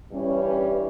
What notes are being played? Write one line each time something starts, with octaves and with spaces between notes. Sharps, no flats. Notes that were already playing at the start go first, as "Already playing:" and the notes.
G2 E3 G3 C#4